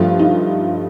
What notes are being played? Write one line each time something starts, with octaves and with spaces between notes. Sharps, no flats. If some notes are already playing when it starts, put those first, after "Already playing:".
Already playing: G2 F3 A3 F4
D#4